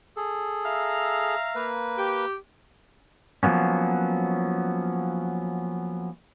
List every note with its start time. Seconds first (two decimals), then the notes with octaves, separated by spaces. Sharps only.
0.17 G#4 A4
0.65 E5 F5 A#5
1.55 A#3 B4
1.97 G4
3.43 F3 F#3 A#3 B3 C#4